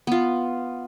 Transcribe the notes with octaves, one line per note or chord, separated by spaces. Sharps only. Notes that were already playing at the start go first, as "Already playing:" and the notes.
B3 F4